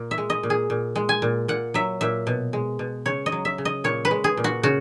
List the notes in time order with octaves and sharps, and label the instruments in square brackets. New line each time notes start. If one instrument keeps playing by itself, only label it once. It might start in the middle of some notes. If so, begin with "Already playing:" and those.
Already playing: [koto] A#2
E5
G#3
D#5
A#2
G#4
A#2
G#3
G#5
A#2
A#2 F#5
F#3 E5
A#2 E5
B2
G#3
B2
C#3 C#5
D#5
F#3
E5
C#3
D#5
A#2 C#5
B4
G#3
G#4
A#2
F#4
C#3 F#4